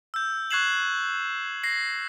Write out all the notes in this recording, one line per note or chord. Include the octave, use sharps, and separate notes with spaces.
E6 G6
C#6 F#6 G#6 C7 E7 F#7
A#6 C7